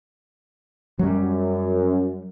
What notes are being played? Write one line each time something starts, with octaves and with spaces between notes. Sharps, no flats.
F#2 F#3 G3